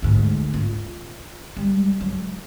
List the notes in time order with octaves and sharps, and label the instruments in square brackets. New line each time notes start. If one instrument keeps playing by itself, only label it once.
[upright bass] D2 G#2
F4
G3
F#3